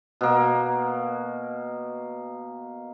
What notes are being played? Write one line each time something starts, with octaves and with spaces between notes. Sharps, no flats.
B2 A#3